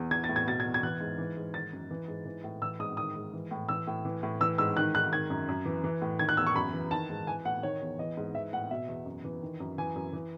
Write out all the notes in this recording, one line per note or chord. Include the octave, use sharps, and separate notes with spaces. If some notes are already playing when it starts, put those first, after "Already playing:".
Already playing: E2
E3 G#6
A6
A2
G#6
B2 A6
G#6
E2
G#6
E3 F#6
G#2
E3
G#2
D#3 A6
F#2
E3
G#2
E3
A2
E3 E6
G#2 D#6
D#3 D#6
G#2
E3
A2
E3 E6
A2
E3
A2
E3 E6
G#2 E6
D#3 F#6
G#2 F#6
D#3 G#6
F#2
F#2
E3
E3
A2
D#3 G#6
F#6
E2 E6
C#6
F#2 B5
E3
D#3 A5
G#2
E3 G#5
A2 F#5
D#3 C#5
E2
E3 D#5
G#2
E3 E5
A2 F#5
B2 E5
E2
F#2
E3
D#3
F#2
E3 G#5
F#2
E3